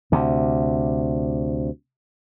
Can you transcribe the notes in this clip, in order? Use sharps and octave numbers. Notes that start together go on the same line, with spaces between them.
D2 C3